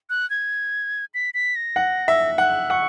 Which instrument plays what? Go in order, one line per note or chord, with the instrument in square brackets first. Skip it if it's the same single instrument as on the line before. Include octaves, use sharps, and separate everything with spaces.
[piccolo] F#6
G#6
B6
B6
A#6
[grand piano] F#5
E5
[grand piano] F#5 [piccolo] F#6
[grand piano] F#5 [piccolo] C#6